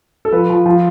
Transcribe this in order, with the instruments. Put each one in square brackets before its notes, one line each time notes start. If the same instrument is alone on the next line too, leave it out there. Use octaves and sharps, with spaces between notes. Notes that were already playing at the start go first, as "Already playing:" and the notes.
[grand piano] A4
F3 B4
F3
F3